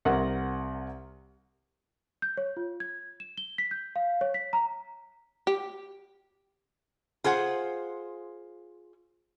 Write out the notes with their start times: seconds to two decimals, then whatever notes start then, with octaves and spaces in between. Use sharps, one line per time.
0.05 C2 A#4 F#5
2.22 G6
2.37 C#5
2.57 F4
2.80 G#6
3.20 E7
3.37 G7
3.58 B6
3.71 G6
3.96 F5
4.21 C#5
4.34 B6
4.53 A#5
5.47 G4
7.24 F4 G#4 C5 F#5